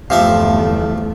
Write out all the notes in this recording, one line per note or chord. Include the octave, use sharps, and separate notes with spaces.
G1 E2 C3 F3 A3 E5 F5